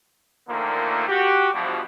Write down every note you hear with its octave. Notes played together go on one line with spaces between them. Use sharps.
A#2 D3 D#3 F3 A3 A#3
F#4 G4
E2 G2 B2 E3 F3